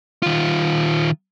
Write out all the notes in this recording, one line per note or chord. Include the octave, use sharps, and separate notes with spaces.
D#3 F4